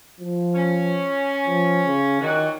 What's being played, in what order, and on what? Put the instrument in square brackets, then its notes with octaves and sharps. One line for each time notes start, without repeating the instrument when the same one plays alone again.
[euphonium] F3
[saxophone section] C#4
[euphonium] F3
C#3
[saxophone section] A#2 F#3 F#4 [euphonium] D#3